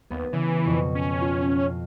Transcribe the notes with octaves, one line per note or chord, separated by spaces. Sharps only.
D#2 B3
C#3 E3
F2 B2 C#6
C#4
F4